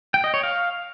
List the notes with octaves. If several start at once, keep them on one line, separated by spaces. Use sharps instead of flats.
G5
D#5
C#5
F5